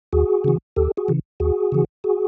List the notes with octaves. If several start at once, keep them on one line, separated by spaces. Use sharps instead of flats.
D#2 F#4 G#4
C#3 E3
D#2 G4 A4
F#4 G#4
C#3 E3
D#2 F#4 G#4
C#3 E3
F#4 G#4